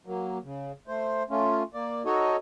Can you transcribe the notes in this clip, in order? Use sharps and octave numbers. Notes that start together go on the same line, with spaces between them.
F#3 A#3
C#3
A3 C5
A3 C#4 F4
A#3 D5
D#4 F#4 A4 C#5 D#5